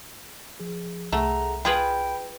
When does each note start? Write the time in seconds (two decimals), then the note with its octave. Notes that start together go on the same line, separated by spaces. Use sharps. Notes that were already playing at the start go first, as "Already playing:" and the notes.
0.60 F3 G#4
1.13 C2 A3 G#4 A4 F#5 A#5
1.65 F4 G#4 B4 G5 B5